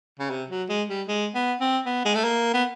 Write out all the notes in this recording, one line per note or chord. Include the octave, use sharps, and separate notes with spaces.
C#3
C3
F#3
G#3
G3
G#3
B3
C4
B3
G#3
A3
A#3
B3